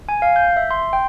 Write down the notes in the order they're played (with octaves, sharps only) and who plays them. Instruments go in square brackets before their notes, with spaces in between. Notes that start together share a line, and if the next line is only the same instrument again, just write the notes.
[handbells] G#5
F5
G6
E5
C6
G5